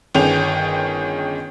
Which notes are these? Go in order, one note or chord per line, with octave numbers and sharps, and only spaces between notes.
G1 D#3 C#4 G#4 G5 F7